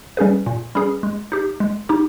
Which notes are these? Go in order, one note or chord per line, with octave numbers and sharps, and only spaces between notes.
G3 C#4 G#4 B4
A#2
G3 C#4 G#4 B4
G#3
D#4 G4
G#3
D#4 G4